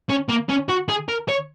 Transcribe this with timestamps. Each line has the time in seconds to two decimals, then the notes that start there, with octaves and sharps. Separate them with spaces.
0.09 C#4
0.29 A#3
0.49 C#4
0.69 F#4
0.88 G#4
1.08 A#4
1.29 C#5